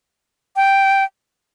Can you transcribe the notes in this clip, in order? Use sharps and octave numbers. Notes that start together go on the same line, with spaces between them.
G5